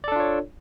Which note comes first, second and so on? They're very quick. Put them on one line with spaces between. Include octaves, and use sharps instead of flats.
D5 A4 D4 F4 C#5